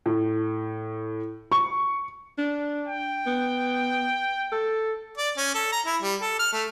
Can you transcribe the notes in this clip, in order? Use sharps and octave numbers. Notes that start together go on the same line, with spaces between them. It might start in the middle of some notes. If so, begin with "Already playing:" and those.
A2
C#6
D4
G5
B3
A4
D5
C#4
A4
A#5
E4
G3
A4
F6
A3